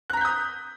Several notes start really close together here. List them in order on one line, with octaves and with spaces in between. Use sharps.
F#6 A#5 B6 G6 D#6